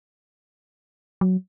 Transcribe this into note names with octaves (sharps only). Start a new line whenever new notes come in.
F#3